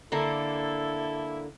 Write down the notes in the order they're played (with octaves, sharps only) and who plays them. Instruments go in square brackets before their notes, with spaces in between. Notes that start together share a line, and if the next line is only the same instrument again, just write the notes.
[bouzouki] D3 A#3 [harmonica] E4 A4